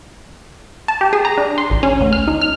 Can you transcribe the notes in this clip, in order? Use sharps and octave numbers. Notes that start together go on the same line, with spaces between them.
A5
G4
G#4
A#5
D4
C6
A1
C#4
D2
F6
D#4
F6